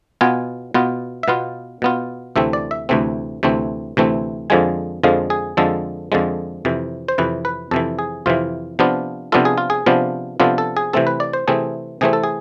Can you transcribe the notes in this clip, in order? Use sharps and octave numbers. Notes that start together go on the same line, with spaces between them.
B2 B3 F4 G#5
B2 B3 F4
E5
B2 B3 F4 F5
B2 B3 F4
D2 C3 E3 A3 C4 E5
D5
E5
D2 C3 E3 A3 C4
D2 C3 E3 A3 C4
D2 C3 E3 A3 C4
F2 D3 F3 G#3 G#5
F2 D3 F3 G#3 F5
G#4
F2 D3 F3 G#3 A4
F2 D3 F3 G#3
F2 C3 E3
C5
F2 C3 E3 B4
B4
F2 C3 E3 A4
G#4
F2 C3 E3 F4
C3 F3 B3 D4 F4
C3 F3 B3 D4 F4 A4
G#4
F4
G#4
C3 F3 B3 D4 F4
C3 F3 B3 D4 F4 A4
A4
G#4
C3 E3 A3 C4 A4
B4
D5
C5
C3 E3 A3 C4 G#4
C3 E3 A3 C4 G#4
A4
G#4